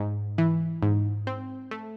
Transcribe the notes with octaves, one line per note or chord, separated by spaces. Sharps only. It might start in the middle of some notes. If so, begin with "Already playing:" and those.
Already playing: G#2
E3
G#2
C4
A3